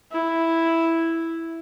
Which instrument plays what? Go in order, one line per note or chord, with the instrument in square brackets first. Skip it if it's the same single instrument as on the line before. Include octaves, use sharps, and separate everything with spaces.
[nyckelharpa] E4